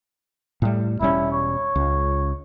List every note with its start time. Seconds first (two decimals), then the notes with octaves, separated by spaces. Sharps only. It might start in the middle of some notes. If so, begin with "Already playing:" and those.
0.62 A2 G3
1.01 E1 G3 C#4 E4
1.32 C#5
1.76 C#2